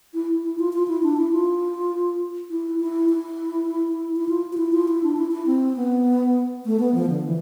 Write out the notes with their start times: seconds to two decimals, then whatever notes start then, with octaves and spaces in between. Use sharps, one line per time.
0.14 E4
0.43 E4
0.59 F4
0.73 F4
0.88 E4
1.03 D4
1.17 E4
1.33 F4
2.50 E4
2.80 E4
3.09 E4
4.16 E4
4.29 F4
4.52 F4
4.57 E4
4.73 F4
4.88 E4
5.03 D4
5.17 E4
5.31 E4
5.46 C4
5.76 B3
6.65 A3
6.79 B3
6.94 F3
7.09 D3
7.24 E3